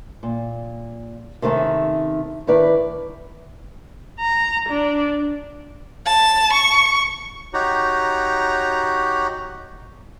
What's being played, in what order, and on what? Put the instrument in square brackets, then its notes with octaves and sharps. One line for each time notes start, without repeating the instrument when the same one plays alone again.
[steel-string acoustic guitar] A#2
C3 D#3 A3 C#4
A2 D#3 E4 B4 D5
[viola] A#5
D4
[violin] A5
C#6
[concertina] D#4 F#4 G4 C#5 A#5